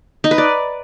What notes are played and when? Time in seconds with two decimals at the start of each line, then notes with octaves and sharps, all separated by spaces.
0.24 D#4
0.31 B4
0.38 D5